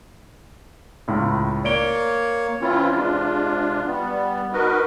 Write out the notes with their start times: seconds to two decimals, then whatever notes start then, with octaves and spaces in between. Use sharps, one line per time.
1.08 C#2 A2 C#3
1.64 A#3 C#5 D5 D7 G7
2.61 E3 C4 C#4 E4 F4
2.91 C3 G#3 D4 F4
3.86 G3 B3
4.53 D#4 F#4 A#4 B4 D#5